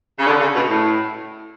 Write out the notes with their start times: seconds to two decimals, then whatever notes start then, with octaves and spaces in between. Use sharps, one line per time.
0.19 C#3
0.27 D3
0.41 C#3
0.55 B2
0.69 A2